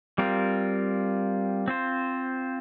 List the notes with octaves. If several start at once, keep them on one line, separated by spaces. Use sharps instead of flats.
G3 C4 F4 A#4
C4 F4 C5